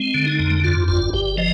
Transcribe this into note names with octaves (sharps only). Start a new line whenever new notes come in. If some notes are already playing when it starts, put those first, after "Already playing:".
Already playing: G#3 C4
D3
D#4
F2
G2 F4
G1 F4
G1 G4
F3 D#5